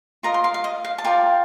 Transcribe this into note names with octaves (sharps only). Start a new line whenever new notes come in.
F4 A#4 D#5 A#5
C6
F5
F5
D#5
F5
A5
F4 A#4 D5 G5